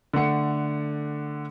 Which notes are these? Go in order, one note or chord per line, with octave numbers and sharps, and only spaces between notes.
D3 A3 F#5 C#7